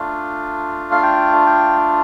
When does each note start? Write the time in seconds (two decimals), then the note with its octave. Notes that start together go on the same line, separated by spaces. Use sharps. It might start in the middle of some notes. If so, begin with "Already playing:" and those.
Already playing: A3 D4 F4
0.91 F5
1.03 G5
1.46 G5